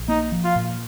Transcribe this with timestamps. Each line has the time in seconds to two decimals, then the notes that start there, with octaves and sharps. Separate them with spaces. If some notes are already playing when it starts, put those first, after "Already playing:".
Already playing: A#1
0.08 A#3 D#4
0.32 F3
0.44 F4
0.56 A#2